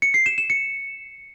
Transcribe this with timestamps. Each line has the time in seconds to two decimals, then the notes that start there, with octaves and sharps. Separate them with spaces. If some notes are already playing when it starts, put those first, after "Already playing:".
0.02 C#7
0.14 C7
0.26 E7
0.38 E7
0.50 C#7